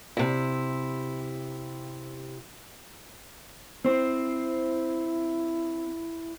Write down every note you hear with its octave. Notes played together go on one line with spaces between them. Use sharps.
C3 E4
C4 E4 C5